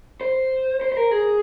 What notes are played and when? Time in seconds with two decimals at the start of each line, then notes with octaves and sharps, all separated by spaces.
0.21 C5
0.81 C5
0.92 C5
0.97 A#4
1.11 G#4